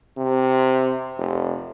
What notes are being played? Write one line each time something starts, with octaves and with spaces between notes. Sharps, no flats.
C3
F1